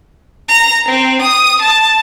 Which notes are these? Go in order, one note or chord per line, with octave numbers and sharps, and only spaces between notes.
A#5
C4
D#6
A5